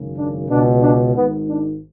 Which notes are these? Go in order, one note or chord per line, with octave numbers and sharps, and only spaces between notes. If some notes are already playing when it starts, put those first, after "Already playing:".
Already playing: G#1 F#2 C#3
D4
C#2 B2 D4
D4
G#1 G#2 B3
D4